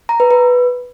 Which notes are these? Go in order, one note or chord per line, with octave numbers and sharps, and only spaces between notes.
A#5
B4
B4